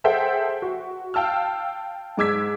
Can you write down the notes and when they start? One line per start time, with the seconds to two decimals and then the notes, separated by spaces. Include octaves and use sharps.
0.04 G#4 A4 C5 E5 F#5 G5
0.62 F#4
1.14 F5 G5 A5 E6 F6
2.17 G#2 G#3 D6 E6 G#6 B6